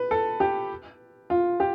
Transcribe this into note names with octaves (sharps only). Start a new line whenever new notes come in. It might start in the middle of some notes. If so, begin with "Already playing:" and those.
Already playing: B4
A4
G4
F4
G4